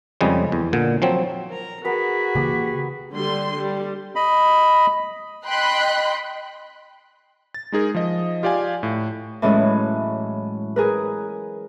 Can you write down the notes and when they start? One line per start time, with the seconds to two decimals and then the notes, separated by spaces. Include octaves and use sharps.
0.21 F2 C#3 G3 G#3
0.52 E2
0.73 A#2 D3
1.02 F3 F#3 C4
1.51 A#4 A#5
1.85 B3 F#4 G#4 A#4 B6
2.35 C#3 E3 A#3 G4
3.11 D3 G3 C6
3.57 G3
4.16 D#5 B5
5.46 D#5 G5 B5 C6 F#6
7.54 A6
7.72 G#3 D#4 G#4 A#4
7.95 F3 D#5
8.43 F4 G4 D5 F5 G#5
8.83 A2
9.42 A2 E3 F#3 G#3 C#4
10.76 G#4 A#4 B4